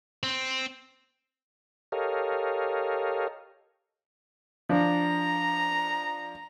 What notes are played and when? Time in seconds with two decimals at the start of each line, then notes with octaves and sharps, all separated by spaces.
0.23 C4
1.92 G4 A4 A#4 C#5 D#5 F5
4.69 F3 D4 A#5